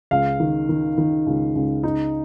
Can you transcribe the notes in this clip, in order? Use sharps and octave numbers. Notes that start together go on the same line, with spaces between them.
C#2 F5
D#3
D#3
D#3
C#2
C#2
D#4